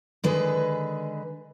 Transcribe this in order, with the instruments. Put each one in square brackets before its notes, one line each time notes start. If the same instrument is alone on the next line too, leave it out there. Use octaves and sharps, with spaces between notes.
[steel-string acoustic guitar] D3 D#3 G#3 G#4 B4